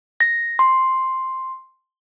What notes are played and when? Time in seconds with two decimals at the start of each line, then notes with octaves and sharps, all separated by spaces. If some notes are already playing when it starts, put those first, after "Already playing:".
0.20 A#6
0.59 C6